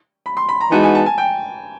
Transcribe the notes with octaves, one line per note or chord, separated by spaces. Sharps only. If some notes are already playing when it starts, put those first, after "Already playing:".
B5
C6
B5
A#5
E3 G#3 B3 D#4 F#4 A5
G#5
A5
G#5
G5